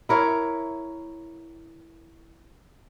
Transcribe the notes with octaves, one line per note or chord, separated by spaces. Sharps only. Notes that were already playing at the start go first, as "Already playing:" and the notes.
E4 A#4 C#5